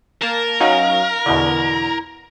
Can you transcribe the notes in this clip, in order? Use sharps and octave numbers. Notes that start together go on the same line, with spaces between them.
A#3 A#4 A5
F#3 C#4 D#4 F5
E2 B2 D3 E4